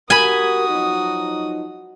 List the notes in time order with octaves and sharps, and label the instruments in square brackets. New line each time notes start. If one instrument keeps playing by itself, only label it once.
[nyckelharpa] F#4 D#6 [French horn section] G4 A#4 [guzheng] G#5 B5
[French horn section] F3 F#3 D#4